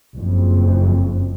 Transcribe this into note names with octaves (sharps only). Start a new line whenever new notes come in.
F#1 F2